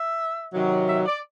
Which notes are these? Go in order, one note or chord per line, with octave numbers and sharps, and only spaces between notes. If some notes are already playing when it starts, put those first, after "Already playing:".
Already playing: E5
C3 D#3 F#3
E5
D5